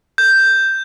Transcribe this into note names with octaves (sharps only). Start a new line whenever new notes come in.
G6